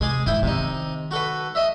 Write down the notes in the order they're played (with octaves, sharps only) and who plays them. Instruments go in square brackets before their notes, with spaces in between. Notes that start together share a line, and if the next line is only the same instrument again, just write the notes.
[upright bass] C3 [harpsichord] G#3 G#4 D6
[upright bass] G#2 E3 [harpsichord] E4 G5
[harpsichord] C3 D#4 [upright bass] D#3
[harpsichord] F#4 A4 B4
D#5 E5